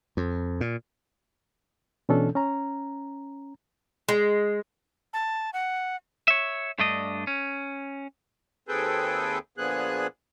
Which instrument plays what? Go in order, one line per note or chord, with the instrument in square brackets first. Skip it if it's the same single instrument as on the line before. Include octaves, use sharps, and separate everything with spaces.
[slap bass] F2
A#2
[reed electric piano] B2 E3 C#4 D4 A4
C#4 A#5
[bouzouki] G#3
[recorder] A5
F#5
[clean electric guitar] C#5 E5
G2 A3 D4 D#5
C#4
[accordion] D#2 C4 G#4 A4 B4 G5
A#2 D3 F3 B3 G#4 F#6